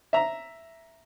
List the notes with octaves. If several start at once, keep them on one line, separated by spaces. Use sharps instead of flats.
E5 A#5